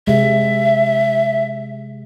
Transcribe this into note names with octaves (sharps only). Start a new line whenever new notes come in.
C3 G#3 E5